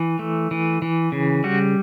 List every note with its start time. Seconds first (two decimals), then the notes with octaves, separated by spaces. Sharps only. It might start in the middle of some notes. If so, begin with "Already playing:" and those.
Already playing: E3
0.19 A3
0.51 E3
0.82 E3
1.12 C#3
1.44 G3 F#4